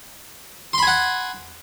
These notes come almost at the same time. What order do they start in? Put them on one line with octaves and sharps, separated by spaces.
C6 B5 G#5 F#5